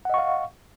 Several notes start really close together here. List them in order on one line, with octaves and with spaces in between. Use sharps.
F#5 D#5 C#6 F5